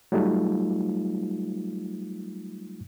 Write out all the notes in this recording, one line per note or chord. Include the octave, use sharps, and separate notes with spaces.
F#3 G3 A3 D#4 F4